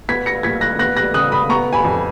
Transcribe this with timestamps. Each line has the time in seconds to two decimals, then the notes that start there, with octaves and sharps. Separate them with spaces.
0.09 B3 G#6 B6
0.26 A#6 C#7
0.43 A#2 G#6 B6
0.61 F#6 A#6
0.79 B3 F#6 A#6
0.97 F#6 A#6
1.14 C#3 D#6 F#6
1.32 B5 D#6
1.49 B3 A#5 C#6
1.73 G#5 B5
1.85 F2